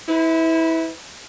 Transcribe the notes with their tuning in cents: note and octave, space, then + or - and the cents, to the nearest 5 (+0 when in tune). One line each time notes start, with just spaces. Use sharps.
E4 -25 B4 +30